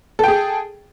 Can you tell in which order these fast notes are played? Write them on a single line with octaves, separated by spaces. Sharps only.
A4 G5 G#4